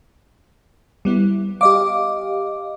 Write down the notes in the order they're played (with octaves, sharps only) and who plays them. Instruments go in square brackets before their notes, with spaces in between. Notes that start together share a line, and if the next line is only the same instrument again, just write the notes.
[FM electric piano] G3 B3 E4
[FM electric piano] G4 D#5 F5 [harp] D6